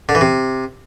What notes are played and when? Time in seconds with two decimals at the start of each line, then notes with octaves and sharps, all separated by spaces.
0.09 D3
0.15 E3
0.21 C3